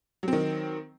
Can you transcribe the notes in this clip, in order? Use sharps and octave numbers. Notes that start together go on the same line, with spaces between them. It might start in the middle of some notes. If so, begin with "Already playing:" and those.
D#3 F#3 C4